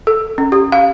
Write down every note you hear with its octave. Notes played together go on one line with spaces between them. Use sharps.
A4
C#4
G4
F5